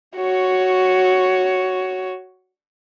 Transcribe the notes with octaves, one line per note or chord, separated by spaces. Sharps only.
F#4 C#5